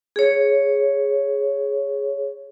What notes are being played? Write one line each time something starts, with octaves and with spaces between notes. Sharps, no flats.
G#4 C#5